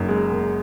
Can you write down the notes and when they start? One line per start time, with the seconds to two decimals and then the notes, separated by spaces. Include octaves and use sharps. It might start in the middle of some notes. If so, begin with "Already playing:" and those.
Already playing: F#1 F#2 D#4
0.08 G#3
0.32 F#1